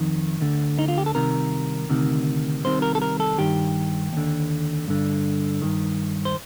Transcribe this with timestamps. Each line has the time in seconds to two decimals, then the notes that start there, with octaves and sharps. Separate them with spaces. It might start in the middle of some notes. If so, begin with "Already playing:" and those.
Already playing: F2 D#3
0.41 D2 D3
0.79 D#4
0.88 F4
0.98 G4
1.06 A4
1.15 C2 C3 D#3 A#4
1.89 D2 C3 D#3
2.64 C2 C3 D#3 C5
2.82 A#4
2.95 A4
3.02 A#4
3.20 A4
3.38 G2 D#3 G4
4.13 D#2 D3
4.88 G2 D3
5.62 G2 D#3
6.25 C5